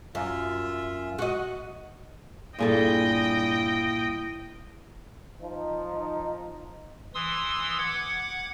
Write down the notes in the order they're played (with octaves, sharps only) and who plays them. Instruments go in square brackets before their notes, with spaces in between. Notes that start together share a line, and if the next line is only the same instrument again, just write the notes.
[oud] F#2 [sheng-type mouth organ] F4 E5
[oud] F#4 D#5
[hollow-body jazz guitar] G2 G#4 A4 [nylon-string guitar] A#2 [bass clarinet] E4 [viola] D#5 G5
[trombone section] F3 D#4
[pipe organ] E3 C6 D#6 E6
F#5 D6 G#6